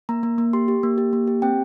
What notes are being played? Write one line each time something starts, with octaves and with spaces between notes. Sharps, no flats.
A#3 A#5
A#3
A#3
G4 C6
G4
A#3
G4
A#3
G4
C4 G5